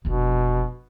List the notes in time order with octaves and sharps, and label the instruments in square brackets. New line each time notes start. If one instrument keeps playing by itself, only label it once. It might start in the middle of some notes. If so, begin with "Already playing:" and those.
[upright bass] F1 D4 [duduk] B2